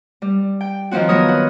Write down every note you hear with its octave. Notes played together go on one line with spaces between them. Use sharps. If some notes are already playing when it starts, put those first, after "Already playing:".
G3
G5
D#3 F3 F#3 C4 F#4
B3 A#4 C#5 D#6
F#4